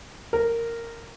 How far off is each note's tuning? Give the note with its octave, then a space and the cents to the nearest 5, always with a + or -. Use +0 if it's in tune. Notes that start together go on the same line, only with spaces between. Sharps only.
A#4 -10